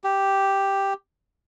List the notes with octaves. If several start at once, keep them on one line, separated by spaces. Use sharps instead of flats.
G4